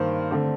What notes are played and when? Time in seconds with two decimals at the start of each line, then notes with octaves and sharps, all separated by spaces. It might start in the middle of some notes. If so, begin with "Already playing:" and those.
Already playing: G2 D#3 A#3 C5
0.31 D3 A3 C4